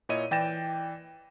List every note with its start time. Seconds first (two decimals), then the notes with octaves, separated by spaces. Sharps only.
0.09 A#2 E4 C#5 D#5 D#7
0.31 E3 D5 G5 A6 A#6 E7